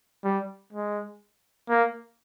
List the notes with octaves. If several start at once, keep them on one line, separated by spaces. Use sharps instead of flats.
G3
G#3
A#3